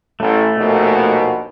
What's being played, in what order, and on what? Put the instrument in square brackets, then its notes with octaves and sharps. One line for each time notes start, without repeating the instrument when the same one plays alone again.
[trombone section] A1 [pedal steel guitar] A3
[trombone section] A#1 D#2 B2